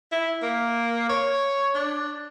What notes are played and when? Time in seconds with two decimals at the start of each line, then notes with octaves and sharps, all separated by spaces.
0.12 E4
0.43 A#3
1.09 C#5
1.74 D4